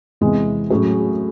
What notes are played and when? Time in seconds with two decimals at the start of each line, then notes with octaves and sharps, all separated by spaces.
0.21 E2 C3 E3 G#3
0.70 A2 F#3 C#4 G#4